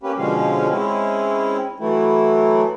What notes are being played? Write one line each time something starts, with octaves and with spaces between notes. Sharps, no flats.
A#3 C#4 G4 B4
B2 D3 F3 G#3 C#4 F5
G#3 C4 C#4 E4
E3 F#3 A3 E4